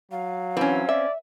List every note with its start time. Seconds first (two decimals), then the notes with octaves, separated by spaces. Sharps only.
0.12 F#3 F5
0.57 E3 C4 C#4
0.89 D5 E5